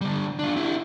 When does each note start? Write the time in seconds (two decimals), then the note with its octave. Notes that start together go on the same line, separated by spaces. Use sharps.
0.01 D3 G3
0.39 D4 F4
0.56 E4 G4